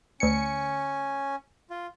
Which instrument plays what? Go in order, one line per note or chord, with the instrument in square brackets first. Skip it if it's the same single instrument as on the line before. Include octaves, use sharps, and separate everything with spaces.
[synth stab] D2 C#7 [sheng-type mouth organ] C#4 G#5
[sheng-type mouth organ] F4